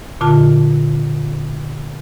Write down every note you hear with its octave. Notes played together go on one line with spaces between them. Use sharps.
A#2 D3 F4 A5